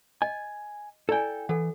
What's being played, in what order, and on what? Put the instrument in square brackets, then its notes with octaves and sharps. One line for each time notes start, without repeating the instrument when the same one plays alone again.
[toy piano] D#5 [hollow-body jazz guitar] G#5
[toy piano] E4 D5 G#5 [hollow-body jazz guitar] A4 G5
[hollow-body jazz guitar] E3 [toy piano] A4 F#5